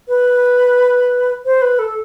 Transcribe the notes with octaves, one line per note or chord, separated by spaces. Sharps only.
B4
C5
B4
A4